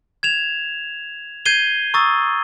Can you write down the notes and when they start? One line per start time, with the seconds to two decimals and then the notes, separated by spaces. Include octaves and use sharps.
0.23 G#6 E7 F7
1.45 G6 G#6 C7 D#7 G7
1.94 A#5 C#6 D#6 E6 A6